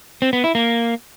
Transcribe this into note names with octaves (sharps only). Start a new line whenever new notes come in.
C4
B3
E4
A#3